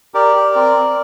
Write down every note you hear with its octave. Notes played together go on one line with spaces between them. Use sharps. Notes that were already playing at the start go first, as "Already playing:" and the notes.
G4 A#4 D5
G4
C4
C4